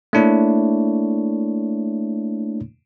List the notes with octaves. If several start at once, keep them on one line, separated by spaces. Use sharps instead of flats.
A3 A#3 D4 E4 C#5